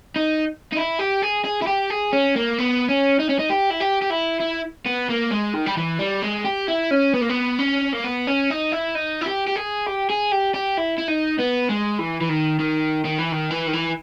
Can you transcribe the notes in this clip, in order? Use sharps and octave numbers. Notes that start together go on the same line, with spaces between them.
D#4
D#4
E4
G4
G#4
G#4
E4
G4
G#4
C#4
A#3
B3
C#4
D#4
C#4
D#4
G4
E4
G4
G4
E4
E4
B3
A#3
G#3
D#3
G3
E3
G3
G#3
G4
E4
C#4
B3
A#3
B3
C#4
A#3
B3
C#4
D#4
E4
D#4
E4
G4
G4
G#4
G4
G#4
G4
G4
E4
E4
D#4
B3
G#3
E3
E3
D#3
D#3
D#3
E3
D#3
E3
D#3
E3